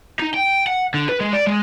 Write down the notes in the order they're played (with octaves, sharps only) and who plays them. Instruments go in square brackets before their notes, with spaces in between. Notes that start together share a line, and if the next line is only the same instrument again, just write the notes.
[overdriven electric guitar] D#4
G5
F#5
D3
B4
G#3
D5
G#3